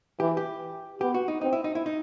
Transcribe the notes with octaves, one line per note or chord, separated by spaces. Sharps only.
E3 G4
G4
B3 G4
F#4
D#4
C4 D#4
E4
D#4
E4
D#4